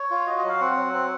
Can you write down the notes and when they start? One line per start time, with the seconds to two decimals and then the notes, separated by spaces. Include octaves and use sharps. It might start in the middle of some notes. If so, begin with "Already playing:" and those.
Already playing: C#5
0.11 F4
0.27 F#4 D#5
0.38 D#5
0.44 F#3 F5
0.60 C4 F#5
0.76 F#3
0.93 C4